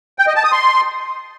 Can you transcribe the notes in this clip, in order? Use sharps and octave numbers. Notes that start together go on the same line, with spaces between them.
G5
D#5
A5
D#6
C6